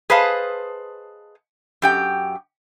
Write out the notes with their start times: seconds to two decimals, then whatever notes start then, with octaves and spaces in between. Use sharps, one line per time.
0.10 G#4 B4 C5 D#5 F5 A5
1.82 F#2 G4 G5